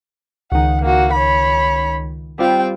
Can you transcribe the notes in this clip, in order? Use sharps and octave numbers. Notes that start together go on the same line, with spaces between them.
C#2 D#3 F#5
A#3 F#4
C#5 B5
G3 C4 F4 G5